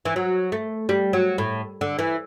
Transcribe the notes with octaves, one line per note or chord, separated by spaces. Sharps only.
E3
F#3
A3
G3
F#3
A2
D3
E3